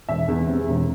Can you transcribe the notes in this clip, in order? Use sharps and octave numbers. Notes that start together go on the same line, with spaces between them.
E1 E5
E2
C3
E1